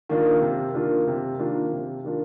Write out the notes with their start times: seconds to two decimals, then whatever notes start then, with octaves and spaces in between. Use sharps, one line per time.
0.09 D#3 A#3 D4 F4
0.42 C3
0.74 D#3 A#3 D4 F4
1.07 C3
1.39 D#3 A#3 D4 F4
1.72 C3
2.04 D#3 A#3 D4 F4